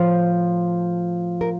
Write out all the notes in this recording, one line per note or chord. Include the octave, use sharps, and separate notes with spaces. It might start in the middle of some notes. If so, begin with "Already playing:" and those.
Already playing: A2 F3 C5
A#4